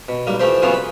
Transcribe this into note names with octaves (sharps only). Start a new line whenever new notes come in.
B2
B1 G3 A#3
E3 F3 A3 G4 C5
C#3 E3 F#3 B3 F4 G#4
B5